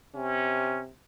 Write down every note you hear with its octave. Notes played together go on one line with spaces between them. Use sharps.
C3 C#4